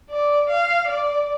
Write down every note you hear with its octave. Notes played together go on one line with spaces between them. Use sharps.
D5
F5
D5